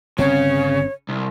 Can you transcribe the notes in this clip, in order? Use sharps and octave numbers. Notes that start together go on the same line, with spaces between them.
G1 C#3 C4 C#5
C2